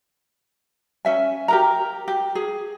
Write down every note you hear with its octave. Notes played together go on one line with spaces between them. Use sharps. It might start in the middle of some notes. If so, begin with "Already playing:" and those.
C#4 E5 G#5
G4 A#4 A#5
G4
G#4